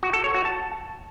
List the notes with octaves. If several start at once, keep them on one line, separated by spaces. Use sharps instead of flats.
F#4
A4
C#5
F#4
A5